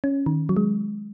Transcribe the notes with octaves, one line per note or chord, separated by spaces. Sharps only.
C#4
D#3
F#3
G#3